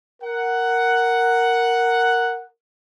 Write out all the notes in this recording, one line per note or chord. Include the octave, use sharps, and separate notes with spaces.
A#4 F#5